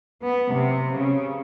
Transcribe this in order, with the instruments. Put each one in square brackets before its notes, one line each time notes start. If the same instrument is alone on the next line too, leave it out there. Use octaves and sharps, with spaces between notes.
[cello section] B3
C3
C#3